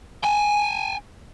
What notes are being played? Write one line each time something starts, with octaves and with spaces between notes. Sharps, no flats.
G5 G#5